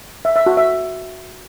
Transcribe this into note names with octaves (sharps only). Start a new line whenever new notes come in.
E5
E5
F#4
E5